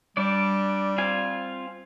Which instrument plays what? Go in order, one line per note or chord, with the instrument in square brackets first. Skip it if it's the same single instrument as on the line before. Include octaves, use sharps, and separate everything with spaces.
[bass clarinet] G3 [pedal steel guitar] D4 D5
[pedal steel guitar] C4 F4 G#5